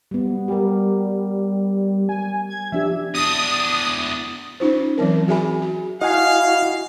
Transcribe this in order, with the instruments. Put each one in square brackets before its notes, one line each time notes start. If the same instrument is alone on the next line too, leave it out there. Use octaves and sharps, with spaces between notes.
[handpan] G3 B3
[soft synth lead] G3 [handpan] G4 A#4
[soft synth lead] G#5
G#6
[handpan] F3 D4 G4 [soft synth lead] E5
[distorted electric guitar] E2 D4 [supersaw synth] D#6
[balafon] C#4 D#4 F4 C5
E3 F#3 C4 A#4
F#4 G#4 E5 G#5 B5
F#4
[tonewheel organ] E4 F#4 [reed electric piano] D#5 F#5 G#5 [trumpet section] F5